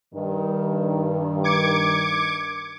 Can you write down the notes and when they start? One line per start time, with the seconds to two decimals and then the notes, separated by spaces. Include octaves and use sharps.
0.14 G2 D#3
1.44 D6 G#6 C#7